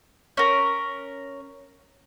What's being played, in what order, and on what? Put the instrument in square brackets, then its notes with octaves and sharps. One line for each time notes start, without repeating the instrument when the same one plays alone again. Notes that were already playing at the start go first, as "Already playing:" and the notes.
[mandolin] C#4 A#4